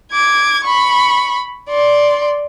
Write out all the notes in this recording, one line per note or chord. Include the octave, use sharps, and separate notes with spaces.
D6 G#6
B5 C#6
D5 C6